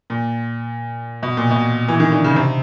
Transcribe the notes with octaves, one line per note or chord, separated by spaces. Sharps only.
A#2
B2
A#2
B2
E3
D#3
D3
C#3
C3